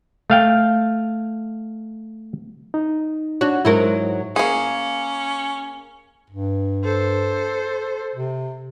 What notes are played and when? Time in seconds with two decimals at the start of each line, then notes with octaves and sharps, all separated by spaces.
0.30 A3 F5 G5
2.74 D#4
3.41 D4 F#4 C#5
3.65 G#2 F#3 E4 A#4
4.36 A#3 C#4 G#4
6.30 G2
6.84 A4 C5
8.16 C3